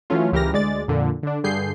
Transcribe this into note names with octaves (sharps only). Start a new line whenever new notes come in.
E3 F#3 A3 C#4 F4
C#2 E3 G4 A#4 F6 A#6
D2 G#3 D5 A6
F2 A#2 D3
D3 D4
G2 D3 G#4 G6 C7